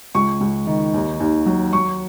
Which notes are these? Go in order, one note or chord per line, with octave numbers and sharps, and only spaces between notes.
C#2 C#6
C#2
D#3
D#2
D#2
F#3
F#3 C#6